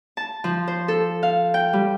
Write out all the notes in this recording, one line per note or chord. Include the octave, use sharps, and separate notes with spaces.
A5
F3
C5
A4
F5
G5
G3